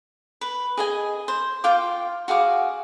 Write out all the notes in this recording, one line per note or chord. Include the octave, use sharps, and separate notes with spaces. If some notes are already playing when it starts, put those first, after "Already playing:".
B4
G#4 D#5 G#5
C5
F4 F5 G5 D6
F#4 G#4 F5 D6